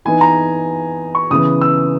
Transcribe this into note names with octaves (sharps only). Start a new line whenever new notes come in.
E3 B3 D#4 G#5
A#5
C#6
C#3 E3 B3 D#6
E6